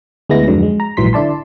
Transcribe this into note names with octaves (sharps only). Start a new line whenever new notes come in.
D2 G#3 B3 E4 A#6
F2 G#2 D3 F#3
G#3
A#5
A#1 G#2 E3 F#3 C6 B6
D3 E4 D5 A5 C6